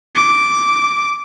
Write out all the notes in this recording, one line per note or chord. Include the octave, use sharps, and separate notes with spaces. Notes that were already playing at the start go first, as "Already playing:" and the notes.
D6